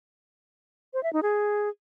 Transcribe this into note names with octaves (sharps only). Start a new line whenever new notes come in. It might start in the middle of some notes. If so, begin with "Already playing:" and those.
C5
E5
D#4
G#4